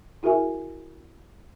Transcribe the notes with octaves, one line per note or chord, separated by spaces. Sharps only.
E4 F#4 G#4 A#4 E5 G#5